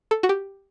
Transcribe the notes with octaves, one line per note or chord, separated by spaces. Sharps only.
A4
F#4
G4